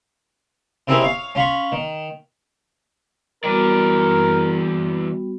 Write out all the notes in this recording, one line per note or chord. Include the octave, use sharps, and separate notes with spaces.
C3 C4 D#4 E4 G#4 A#4
C#5 F5
C#4 F4 B5 C#6
D#3
E3 G3 B3 F#4 A#4 D5